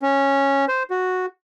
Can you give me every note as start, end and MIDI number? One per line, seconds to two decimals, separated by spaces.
0.02 0.65 61
0.68 0.83 72
0.90 1.26 66